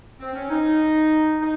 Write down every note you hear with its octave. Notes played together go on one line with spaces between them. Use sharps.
C4
C#4
D#4
D#4